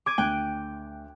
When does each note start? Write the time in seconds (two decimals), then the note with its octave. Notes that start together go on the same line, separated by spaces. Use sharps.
0.06 D6 G#6 D#7
0.18 D2 G5 F#6